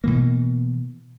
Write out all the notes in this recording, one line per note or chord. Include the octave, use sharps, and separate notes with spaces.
B2 E3 A#3